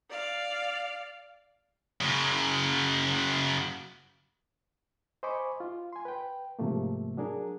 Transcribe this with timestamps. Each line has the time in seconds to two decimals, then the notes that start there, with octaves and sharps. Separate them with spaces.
0.10 D5 F5
2.01 F#2 C#3
5.23 C5 D#5 G#5 B5 C#6 D6
5.60 F4
5.93 G#5 C6
6.05 B4 G5
6.59 G#2 C3 F3 A3 A#3
7.17 F#3 D4 G#4 A#4